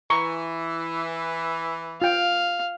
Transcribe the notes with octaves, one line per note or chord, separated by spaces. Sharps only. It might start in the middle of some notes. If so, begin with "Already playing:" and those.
E3 A#5 C#6
F4 F5 G5